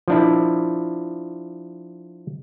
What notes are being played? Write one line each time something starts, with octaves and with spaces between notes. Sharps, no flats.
F3 D4 E4